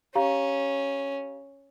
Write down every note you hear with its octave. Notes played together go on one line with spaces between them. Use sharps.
C#4 G4 F5 A#5